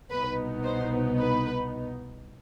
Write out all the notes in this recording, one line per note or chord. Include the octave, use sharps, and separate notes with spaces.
C2 B2 B3 D#4 B4
C5
B4